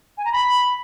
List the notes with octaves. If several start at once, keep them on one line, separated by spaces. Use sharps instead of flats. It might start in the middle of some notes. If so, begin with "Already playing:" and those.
G#5
A#5
B5